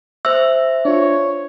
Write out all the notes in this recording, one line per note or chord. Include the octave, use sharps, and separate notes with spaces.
C5 E5 E6
D4 F4 C#5